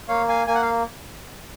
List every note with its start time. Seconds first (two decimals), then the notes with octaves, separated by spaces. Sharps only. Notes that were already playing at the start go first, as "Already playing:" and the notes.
0.08 A#3 C#5 F5
0.28 F5 G#5
0.47 A#3 G#5
0.54 F#5
0.62 F5